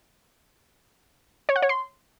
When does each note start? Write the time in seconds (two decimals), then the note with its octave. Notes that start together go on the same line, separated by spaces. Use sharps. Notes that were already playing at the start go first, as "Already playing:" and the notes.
1.49 C#5
1.56 F#5
1.62 C#5
1.69 C6